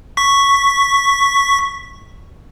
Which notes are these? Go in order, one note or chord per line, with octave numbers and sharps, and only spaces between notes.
C#6 B6